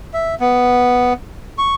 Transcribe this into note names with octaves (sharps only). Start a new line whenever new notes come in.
E5
B3
C#6